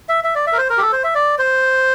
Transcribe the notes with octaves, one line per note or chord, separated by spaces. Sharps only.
E5
E5
D5
E5
A#4
C5
A#4
G4
A4
C5
E5
D5
C5